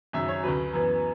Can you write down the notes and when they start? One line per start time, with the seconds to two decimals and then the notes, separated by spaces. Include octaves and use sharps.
0.13 G#1 F#2 C#3 E5
0.28 C#5
0.44 D2 C#3 F#3 B4
0.73 F#2 E3 B3